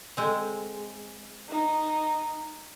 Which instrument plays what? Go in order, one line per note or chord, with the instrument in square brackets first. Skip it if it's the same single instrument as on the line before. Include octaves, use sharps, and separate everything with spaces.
[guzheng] G#3 C4
[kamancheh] D#4